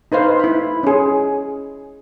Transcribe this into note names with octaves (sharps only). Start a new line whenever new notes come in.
D#4 B4 C5 F5
E4 B5
C#4 G#4